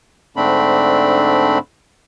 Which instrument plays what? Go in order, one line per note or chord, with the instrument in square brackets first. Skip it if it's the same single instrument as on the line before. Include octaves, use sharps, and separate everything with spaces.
[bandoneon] G#2 D3 A3 C4 D4 B5